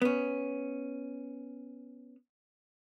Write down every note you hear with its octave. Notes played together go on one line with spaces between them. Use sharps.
B3 C#4